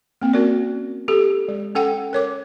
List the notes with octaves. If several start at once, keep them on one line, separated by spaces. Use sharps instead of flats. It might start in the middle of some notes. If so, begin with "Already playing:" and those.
A#3 C4
C#4 F#4 A#4 D5
G4 A4
G#3
C#4 A4 F#5 G5
A#4 C#5 D6